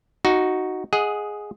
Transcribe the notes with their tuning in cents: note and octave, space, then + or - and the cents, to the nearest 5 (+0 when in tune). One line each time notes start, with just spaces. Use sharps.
D#4 +0 F#4 +0
G#4 +0 D#5 +20 F#5 -10